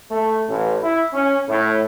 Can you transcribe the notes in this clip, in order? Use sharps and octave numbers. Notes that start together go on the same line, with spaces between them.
A3
A1
E4
C#4
A2